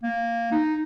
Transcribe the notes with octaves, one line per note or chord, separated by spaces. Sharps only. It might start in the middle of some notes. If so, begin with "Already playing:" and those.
A#3
D#4